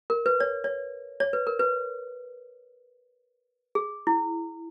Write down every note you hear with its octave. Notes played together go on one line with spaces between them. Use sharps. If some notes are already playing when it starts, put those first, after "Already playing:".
A#4
B4
C#5
C#5
C#5
B4
A#4
B4
G#4
E4